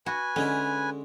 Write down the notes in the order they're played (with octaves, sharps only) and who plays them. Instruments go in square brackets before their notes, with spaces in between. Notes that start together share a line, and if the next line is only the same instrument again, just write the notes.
[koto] F#4 [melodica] B4 G#5
[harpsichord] D3 G#3 E4 [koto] C#4